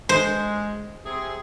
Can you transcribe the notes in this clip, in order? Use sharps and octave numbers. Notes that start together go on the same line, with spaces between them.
G#3 C5
C3 G#4